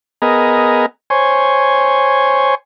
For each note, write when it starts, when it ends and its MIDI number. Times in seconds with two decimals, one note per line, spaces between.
0.22 0.86 59
0.22 0.86 68
0.22 0.86 70
0.22 0.86 75
1.10 2.55 72
1.10 2.55 73
1.10 2.55 80